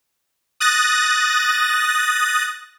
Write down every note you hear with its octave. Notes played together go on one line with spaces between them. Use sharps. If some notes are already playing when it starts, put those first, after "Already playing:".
D#6 F#6 A6 A#6